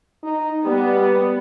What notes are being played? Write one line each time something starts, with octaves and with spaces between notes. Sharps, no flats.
D#4
G3 B3